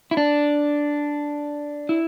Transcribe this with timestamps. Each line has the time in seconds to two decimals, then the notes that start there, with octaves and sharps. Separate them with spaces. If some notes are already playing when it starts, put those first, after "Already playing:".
0.11 E4
0.17 D4
1.89 E4